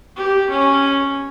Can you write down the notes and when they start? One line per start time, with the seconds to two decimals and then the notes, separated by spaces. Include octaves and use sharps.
0.16 G4
0.50 C#4